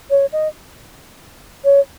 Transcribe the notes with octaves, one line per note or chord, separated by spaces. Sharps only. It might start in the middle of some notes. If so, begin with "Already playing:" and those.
C#5
D#5
C#5